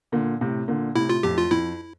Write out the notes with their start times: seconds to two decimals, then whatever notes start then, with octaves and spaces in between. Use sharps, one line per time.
0.12 A#2 D3
0.41 A2 C3
0.68 A#2 D3
0.96 A2 C3 E4
1.09 F4
1.23 F2 A2 G4
1.37 F4
1.51 F2 E4